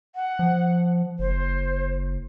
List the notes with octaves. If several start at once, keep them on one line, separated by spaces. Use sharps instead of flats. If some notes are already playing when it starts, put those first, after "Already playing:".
F#5
F3
F#1 C5